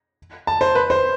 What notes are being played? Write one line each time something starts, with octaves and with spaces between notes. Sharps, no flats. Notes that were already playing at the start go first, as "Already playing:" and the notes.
A5
C5
B4
C5